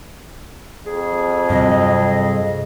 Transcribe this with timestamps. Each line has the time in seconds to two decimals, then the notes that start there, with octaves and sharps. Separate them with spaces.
0.86 F2 G#4
1.50 G2 C3 F#3 D#5